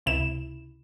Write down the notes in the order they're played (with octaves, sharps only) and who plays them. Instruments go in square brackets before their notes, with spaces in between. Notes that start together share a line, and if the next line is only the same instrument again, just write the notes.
[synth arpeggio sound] C#2 C3 E4 E7